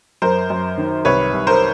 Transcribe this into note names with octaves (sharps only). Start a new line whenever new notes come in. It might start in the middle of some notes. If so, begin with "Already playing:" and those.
F#2 A#4 C5
F#2
D#3
C2 B4 C#5
C2
A#4 C5